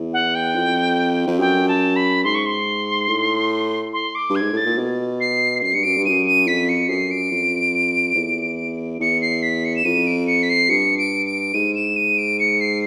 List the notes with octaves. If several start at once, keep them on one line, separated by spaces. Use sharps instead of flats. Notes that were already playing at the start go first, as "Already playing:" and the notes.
Already playing: E2
F#5
G5
F2
F2
F#2 G5
A5
B5
G#2 C6
C#6
C6
A2
C6
D6
G2
G#6
G#2
A2 A6
A#2
B2
C7
F#2 C7
G2 C#7
F#2 D7
G2
F#2 D#7
D#7
F2 B6
C#7
F#2 C7
D7
F2
E2
E2 C#7
C7
B6
C#7
E7
F2 D#7
D7
C#7
B6
C7
G2 C#7
D7
D7
G#2 D#7
E7
D#7
D7
C#7
C7